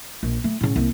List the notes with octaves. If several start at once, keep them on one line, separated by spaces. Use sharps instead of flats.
A#1
A3
A2 C#3
C2 A#3